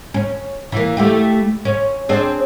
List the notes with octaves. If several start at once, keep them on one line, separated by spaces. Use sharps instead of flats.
C#4
E3 A#3
A3 E4 G4
C#4
C4 D4 G#4